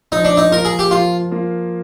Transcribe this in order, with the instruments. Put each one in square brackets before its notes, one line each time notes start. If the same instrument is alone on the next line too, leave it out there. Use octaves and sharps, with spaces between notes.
[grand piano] F3 [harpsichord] D#4
[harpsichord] D4
D#4
[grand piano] A#3 F4 [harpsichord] A#4
[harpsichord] G#4
G4
[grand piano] F3 [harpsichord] F4
[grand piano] A#3 F4